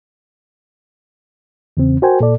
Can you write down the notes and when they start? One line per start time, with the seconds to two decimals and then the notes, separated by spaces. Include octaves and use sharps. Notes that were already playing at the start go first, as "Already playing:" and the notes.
1.77 E2 C#3 C4
2.02 F#4 A#4 C5 G5 G#5
2.20 A#2 A4 D5